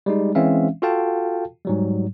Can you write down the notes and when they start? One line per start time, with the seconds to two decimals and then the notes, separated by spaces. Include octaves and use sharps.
0.06 G3 G#3 D#4
0.35 E3 G#3 C4 C#4 E5 F5
0.82 F4 F#4 A4 F5 G5 A5
1.65 G#2 F#3 G3